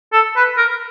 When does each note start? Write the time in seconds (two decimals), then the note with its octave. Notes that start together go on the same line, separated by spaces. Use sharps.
0.13 A4
0.36 B4
0.57 A#4